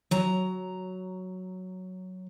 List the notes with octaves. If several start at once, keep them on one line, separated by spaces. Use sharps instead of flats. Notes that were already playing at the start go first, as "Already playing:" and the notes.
F#3 A#5